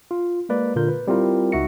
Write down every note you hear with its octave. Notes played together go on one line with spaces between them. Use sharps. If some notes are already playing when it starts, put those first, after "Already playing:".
F4
G#3 A#3 B4 D5
A#2 D3 F4 A#4 G6
B4
G3 C4 E4 F4 A#4 G5
C#2 D#4 F#4 E5 A#6 C#7